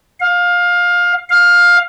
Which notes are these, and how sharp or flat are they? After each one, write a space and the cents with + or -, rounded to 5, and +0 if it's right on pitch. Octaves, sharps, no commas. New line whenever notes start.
F5 +20
F5 +15